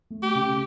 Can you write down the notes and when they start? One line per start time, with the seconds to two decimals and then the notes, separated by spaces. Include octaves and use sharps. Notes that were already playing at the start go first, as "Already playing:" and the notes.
0.10 A3
0.22 G4
0.35 C#3